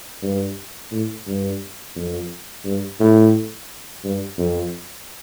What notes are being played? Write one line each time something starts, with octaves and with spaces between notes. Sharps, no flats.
G2
A2
G2
F2
G2
A2
G2
F2